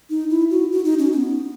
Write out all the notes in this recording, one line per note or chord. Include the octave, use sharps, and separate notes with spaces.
D#4
E4
F#4
F#4
D#4
C#4
C#4
B3